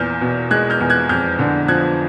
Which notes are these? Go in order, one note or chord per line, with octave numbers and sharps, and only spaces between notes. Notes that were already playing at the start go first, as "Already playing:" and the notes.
Already playing: E2 A#2 F6 G6
B2
G#3 F#6 G#6
F6 G6
E2
F#6 G#6
F2 F6 G6
D3
F3 F#6 G#6